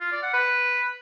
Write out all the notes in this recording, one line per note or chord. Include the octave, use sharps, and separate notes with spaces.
F4
D5
F#5
B4